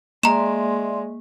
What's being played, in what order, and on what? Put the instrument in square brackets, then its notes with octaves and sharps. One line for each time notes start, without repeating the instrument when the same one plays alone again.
[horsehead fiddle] G#3 [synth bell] A#3 [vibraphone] D5 E5 C6 [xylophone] A#5 E7